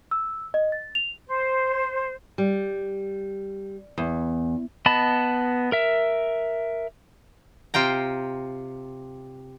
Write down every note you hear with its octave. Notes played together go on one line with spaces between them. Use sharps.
E6
D#5
A6
F7
C5
G3
E2
B3 D#5 A5 B5
A#4 E5
C3 F4 G5 A#5